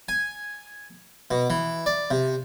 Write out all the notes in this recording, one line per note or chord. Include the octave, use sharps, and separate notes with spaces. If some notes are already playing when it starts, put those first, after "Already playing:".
G#5
B2
E3
D5
C3